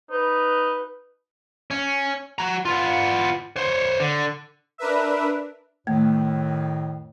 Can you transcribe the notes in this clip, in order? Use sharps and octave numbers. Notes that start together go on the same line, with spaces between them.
D#4 B4
C#4
F#4 A#5
B3 F4
C5 C#5
D3
D4 A#4 B4 E5
F2 A2 D#3 A3